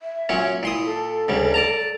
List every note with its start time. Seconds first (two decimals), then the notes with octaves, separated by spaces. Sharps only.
0.02 E5
0.29 A#2 F#3 C#4
0.63 A#2 E4 C6 D#6
0.85 A4
1.28 D2 C#3 G3
1.54 D5 A5 A#5